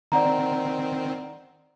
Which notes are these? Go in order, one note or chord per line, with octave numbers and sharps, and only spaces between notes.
D#3 C4 D5 F#5 A#5